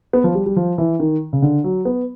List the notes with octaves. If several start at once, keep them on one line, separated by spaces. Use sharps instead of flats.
B3
F3
G3
G3
F3
E3
D#3
C#3
D3
F#3
B3